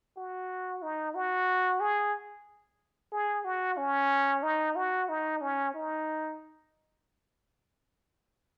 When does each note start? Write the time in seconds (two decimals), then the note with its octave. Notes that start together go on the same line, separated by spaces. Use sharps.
0.17 F#4
0.83 D#4
1.15 F#4
1.80 G#4
3.12 G#4
3.45 F#4
3.77 C#4
4.43 D#4
4.76 F#4
5.09 D#4
5.41 C#4
5.74 D#4